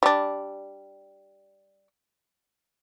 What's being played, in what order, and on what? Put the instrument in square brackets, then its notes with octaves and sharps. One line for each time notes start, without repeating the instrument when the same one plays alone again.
[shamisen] G3 D4